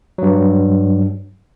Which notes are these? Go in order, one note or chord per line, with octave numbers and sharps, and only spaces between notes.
G2 F#3